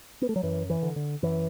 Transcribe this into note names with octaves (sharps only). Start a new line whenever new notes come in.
B3
A3
F#3
F#2 E3
E3
D3
D3
F#2 E3